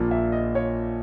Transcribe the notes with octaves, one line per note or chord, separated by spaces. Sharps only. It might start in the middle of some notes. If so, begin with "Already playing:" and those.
Already playing: A#1 A#2 A#3
E5
D#5
C#5